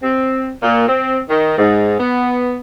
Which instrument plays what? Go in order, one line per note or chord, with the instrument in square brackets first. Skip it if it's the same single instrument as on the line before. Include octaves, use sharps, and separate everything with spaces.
[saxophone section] C4
A#2
C4
D#3
G#2
B3